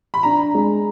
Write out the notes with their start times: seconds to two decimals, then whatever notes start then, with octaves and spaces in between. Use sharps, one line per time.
0.14 B5
0.23 D4 A#5
0.55 G#3